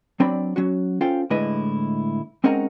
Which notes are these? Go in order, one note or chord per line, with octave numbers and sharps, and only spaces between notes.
F#3 C4 D4 D5 B5
F#3 C#4 F#4
C#4 F4 A4 C5 F5 G5
A2 D3 G#3 E4 B4 D#5
G#3 C4 C#4 D#4 A#4 F#5